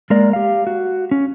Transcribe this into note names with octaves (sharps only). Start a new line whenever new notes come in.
G#3 A#3 A#4 D5
G4 F5
F#4
C#4